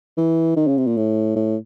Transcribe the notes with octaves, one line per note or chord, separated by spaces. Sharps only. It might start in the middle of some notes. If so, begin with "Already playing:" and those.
E3
D#3
C#3
C3
A#2
A2
A2